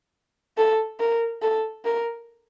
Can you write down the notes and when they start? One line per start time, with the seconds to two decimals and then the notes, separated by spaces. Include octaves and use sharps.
0.58 A4
1.00 A#4
1.42 A4
1.85 A#4